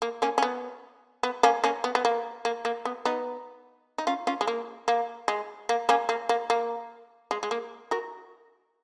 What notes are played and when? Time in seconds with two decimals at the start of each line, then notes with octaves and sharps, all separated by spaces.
0.02 A#3
0.22 A#3 C#4
0.38 C#4
0.42 B3
1.23 B3
1.43 A#3 C#4
1.64 A#3 C#4
1.84 B3
1.95 B3
2.05 A#3
2.45 A#3
2.65 A#3
2.85 B3
3.05 B3 D#4
3.98 D#4
4.07 C#4 F4
4.27 C#4 F4
4.41 G#3
4.47 A#3
4.88 A#3
5.28 G#3
5.69 A#3
5.89 A#3 C#4
6.09 A#3
6.29 A#3
6.50 A#3
7.31 G#3
7.43 G#3
7.51 A#3
7.91 F#4 A#4